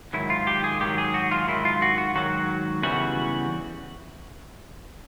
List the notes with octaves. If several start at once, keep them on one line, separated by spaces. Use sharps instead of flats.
G#2 D#3 F#3 E4
F4
G4
G#4
G#2 D#3 F#3 G4
G#4
F#4
F4
G#2 D#3 F#3 E4
F4
F#4
F#4
G#2 D#3 F#3 F#4
E2 C#3 E3 G3 F#4